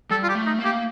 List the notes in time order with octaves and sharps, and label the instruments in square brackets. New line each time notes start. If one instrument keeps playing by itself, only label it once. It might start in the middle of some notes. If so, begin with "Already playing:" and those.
[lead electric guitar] G3 [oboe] A4
[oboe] F4
G4
[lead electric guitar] A3
[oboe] D#4
[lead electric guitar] A#3
[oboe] G4